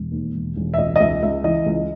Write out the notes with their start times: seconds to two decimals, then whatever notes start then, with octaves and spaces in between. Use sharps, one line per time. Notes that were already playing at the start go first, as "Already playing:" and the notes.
Already playing: E1
0.12 D#2
0.34 E1
0.56 E1
0.74 E5
0.78 C#2 D#5
0.96 D#5
1.00 C#2 E5
1.23 C#2 E5
1.44 E3 D#5
1.66 C#2